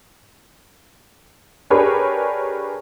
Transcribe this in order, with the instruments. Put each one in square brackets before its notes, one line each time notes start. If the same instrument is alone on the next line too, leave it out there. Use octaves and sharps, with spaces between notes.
[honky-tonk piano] D4 G4 G#4 A#4 B4 C#5